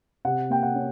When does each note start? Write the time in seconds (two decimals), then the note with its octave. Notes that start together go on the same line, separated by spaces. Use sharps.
0.25 C3 F#5
0.50 A#3 G5
0.63 F#5
0.75 C#4